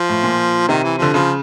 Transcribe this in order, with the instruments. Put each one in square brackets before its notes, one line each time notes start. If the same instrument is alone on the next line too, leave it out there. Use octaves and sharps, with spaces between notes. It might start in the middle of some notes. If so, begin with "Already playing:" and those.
Already playing: [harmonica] F3
[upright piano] A2
A#2
[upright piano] C3 [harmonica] D#3
[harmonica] E3
[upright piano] D3 [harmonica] F3
[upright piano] C#3 [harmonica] F3